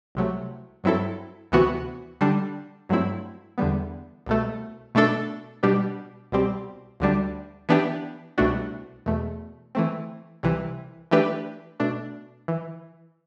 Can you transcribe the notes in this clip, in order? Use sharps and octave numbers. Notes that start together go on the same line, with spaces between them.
C2 C3 F#3 A3
G2 F#3 C4 E4 A4
D2 C3 E3 B3 F#4
D3 G3 D4
G2 F#3 A3 C4 E4
E2 D3 G3 B3
C2 B2 A3
B2 A3 D4 A4
B2 G3 B3 D4 G4
C2 B2 G3 C4 G4
D2 D3 G3 D4
E3 B3 D4 G4
C2 B2 A3 D4 F#4
E2 B2 A3
E3 A3 C4
C2 C3 E3
E3 A3 D4 G4 B4
B2 A3 D4
E3